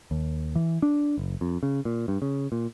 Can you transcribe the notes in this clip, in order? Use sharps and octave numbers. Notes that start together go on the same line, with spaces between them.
D#2
E3
D4
F#1
F2
C#3
A#2
G2
C#3
A#2